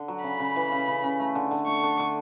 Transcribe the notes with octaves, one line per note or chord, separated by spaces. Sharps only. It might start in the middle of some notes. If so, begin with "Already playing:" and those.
Already playing: D3
F#3
C#3 B5
C#3
E3
C#3
C#3
C#3
A3
D3
D3
A3 C#6
D3
D3